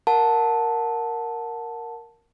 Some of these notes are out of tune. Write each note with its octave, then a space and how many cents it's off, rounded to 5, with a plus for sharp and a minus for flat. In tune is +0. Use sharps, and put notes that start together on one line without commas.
A#4 +0 F#5 -20 A5 +0